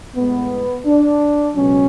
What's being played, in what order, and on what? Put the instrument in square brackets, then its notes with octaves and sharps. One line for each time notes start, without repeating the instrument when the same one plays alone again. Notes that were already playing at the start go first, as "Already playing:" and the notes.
[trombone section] A2 G#3 B3
D4
C#2 B2 F#3 C#4